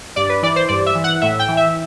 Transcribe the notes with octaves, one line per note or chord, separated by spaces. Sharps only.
G2 D5
B4
E3 D5
C5
G2 D5
E5
E3
F#5
A2 E5
G5
E3
E5